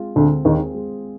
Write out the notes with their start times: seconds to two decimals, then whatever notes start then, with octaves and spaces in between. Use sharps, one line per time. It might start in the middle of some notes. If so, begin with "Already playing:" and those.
Already playing: G#3 C4 F4
0.16 D2 D3 C4
0.45 D#2 D#3 G#4
0.75 G#3